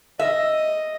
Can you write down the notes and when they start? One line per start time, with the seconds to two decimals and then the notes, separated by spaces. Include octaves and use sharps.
0.19 D#5 E5